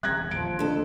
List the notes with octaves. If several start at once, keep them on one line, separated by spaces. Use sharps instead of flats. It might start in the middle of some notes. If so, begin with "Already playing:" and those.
E1 G3 F#6 G#6 A#6
D#2 A#2 D3 F3 D7
F2 D4 A4